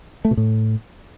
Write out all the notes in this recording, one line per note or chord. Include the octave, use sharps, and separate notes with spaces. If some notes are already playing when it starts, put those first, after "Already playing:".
A3
B2
A2